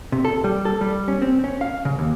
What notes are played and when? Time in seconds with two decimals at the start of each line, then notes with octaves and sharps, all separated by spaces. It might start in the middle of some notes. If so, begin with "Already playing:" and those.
0.12 C3
0.25 A4
0.44 G3
0.65 A4
0.81 G3
1.08 C#4
1.22 C4
1.44 C#4
1.61 F5
1.85 C#3
1.99 D#2